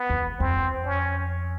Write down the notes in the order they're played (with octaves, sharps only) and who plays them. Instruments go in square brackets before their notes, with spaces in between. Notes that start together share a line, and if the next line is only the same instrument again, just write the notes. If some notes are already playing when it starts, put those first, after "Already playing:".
Already playing: [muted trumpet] B3
[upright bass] E2
[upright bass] F2 [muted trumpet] C4
[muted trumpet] C#4